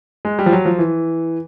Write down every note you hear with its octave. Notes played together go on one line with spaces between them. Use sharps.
G#3
G3
F3
F#3
F3
E3